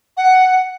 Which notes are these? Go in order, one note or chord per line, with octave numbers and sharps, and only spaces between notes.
F#5